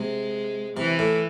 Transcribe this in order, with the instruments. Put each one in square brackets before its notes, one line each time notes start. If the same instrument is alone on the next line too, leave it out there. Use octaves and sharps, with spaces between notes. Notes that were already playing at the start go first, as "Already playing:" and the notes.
Already playing: [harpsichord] C3 [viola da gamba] G#3
[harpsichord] C3 [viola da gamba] E3
[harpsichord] A2